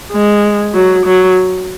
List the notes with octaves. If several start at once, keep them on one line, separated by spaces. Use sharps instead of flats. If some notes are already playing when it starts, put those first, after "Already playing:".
G#3
F#3
F#3